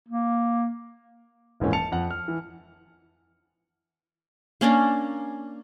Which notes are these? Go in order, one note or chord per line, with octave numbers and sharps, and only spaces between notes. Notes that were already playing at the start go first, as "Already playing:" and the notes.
A#3
D#1 G#2 E3 A#3 C#4
A5 C#7 F7
F2 F#5
F6
E3
A#3 C#4 D4 A#4